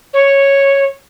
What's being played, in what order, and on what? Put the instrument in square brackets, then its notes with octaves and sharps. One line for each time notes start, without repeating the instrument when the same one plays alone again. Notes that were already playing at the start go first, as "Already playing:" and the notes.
[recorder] C#5